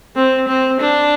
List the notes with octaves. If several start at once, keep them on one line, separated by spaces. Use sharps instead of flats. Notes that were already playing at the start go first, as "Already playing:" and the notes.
C4
C4
D4